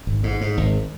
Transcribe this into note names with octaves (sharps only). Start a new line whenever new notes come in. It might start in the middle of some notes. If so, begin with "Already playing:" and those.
G#1
G#2
G#2
G#1